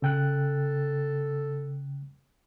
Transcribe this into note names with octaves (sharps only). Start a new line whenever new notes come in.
C#3 A4 G5 F#6